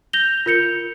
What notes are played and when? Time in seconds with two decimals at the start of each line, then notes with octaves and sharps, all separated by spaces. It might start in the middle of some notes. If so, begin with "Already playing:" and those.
0.13 G6 A#6 F7 G7
0.46 F4 A#4 G6 C#7 F7